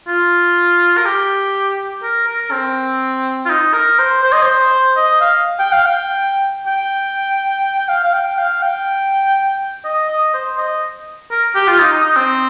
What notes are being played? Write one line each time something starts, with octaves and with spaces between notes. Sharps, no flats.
F4
A#4
G4
A#4
A#4
C4
F4
D#4
A#4
C5
C5
D#5
C5
D#5
F5
G5
F5
G5
G5
G5
F5
F5
G5
F5
G5
D#5
D#5
C5
D#5
A#4
G4
F4
D#4
D#4
D#4
C4